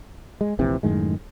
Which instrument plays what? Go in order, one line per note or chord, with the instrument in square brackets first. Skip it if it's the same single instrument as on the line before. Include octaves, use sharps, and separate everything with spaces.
[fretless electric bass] G#3
F1 A#1 C3 E3
F#2 A2 D#3 G#3